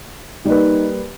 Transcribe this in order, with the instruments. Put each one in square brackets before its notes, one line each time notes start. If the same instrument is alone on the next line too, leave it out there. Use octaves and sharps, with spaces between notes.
[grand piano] G3 A#3 B4 [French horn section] D#4